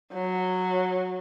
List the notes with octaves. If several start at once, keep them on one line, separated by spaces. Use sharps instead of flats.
F#3